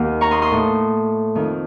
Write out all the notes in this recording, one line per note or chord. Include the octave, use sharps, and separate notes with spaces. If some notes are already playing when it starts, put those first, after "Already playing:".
Already playing: D#2 D#3 F#5
A#5 C#6
C6 D#6
C6 D#6
A2
F2 D#3